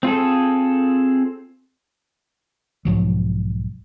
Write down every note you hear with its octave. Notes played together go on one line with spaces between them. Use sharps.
C4 F4 G#4 A4
B1 G#2 F3 F#3